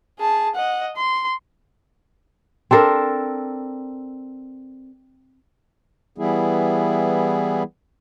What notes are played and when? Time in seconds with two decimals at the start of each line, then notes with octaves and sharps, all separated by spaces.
0.19 G#4 A5
0.55 D#5 F#5
0.96 C6
2.71 C4 D4 A4 A#4
6.18 E3 G3 B3 E4 G#4